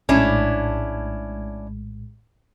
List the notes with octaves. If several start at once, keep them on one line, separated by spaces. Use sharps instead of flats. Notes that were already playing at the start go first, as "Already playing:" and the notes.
A#1 A2 G#3 C#4 D4 E4